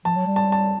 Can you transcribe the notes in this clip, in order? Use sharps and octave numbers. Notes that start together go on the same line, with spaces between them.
F3 A5
F#3
G3
A5
A5